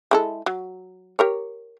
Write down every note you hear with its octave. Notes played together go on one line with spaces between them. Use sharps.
G#3 E4 A4
F#3
G4 A#4 C#5